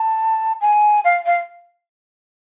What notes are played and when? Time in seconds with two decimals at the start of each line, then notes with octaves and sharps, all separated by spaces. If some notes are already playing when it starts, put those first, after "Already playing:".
Already playing: A5
0.61 G#5
1.05 F5
1.26 F5